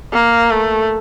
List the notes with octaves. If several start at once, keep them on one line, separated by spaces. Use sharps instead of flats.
A#3
A3